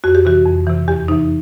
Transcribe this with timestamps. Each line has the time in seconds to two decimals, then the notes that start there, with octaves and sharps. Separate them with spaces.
0.04 F2 F#4
0.15 G4
0.25 C3 E3 F#4
0.46 F2
0.67 C3 E3
0.88 E2 G4
1.08 C3 E3 D#4